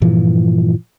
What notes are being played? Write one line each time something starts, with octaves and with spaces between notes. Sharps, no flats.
G2 A#2 E3 F3